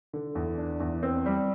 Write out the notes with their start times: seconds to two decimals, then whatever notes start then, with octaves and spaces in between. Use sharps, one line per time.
0.13 D3
0.35 E2
0.58 D4
0.80 E2
1.03 C4
1.26 G3